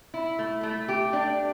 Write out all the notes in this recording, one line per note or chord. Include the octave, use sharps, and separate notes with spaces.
E4
A3
A3
G4
D4